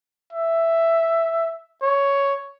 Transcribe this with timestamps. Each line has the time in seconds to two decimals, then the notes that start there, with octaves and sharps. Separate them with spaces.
0.33 E5
1.82 C#5